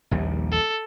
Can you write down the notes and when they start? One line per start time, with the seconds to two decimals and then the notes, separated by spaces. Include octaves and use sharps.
0.11 A#1 D#2 G3
0.52 A4